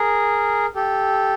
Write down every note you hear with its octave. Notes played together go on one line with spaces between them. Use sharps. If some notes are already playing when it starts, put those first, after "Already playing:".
Already playing: G#4 A#4
G4 A4